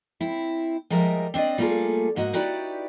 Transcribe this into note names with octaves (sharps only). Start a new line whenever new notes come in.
C4 E4
F3 G3 G#3 A#4 D#5 E5
C4 D4 D5 D#5
G3 A3 A#3 F4 G#4 A4
G#2 A#3 F#4 D#5
D#4 E4 F#4 G4 B4 D5